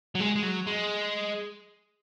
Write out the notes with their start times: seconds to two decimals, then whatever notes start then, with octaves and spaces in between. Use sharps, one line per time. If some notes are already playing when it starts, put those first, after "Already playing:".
0.15 F#3
0.20 G#3
0.36 G#3
0.43 F#3
0.67 G#3